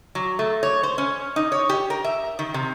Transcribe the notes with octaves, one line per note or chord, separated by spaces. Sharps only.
F#3
A3
C#5
C5
C#4
D#4
C#5
G4
A#4
E5
D#3
C3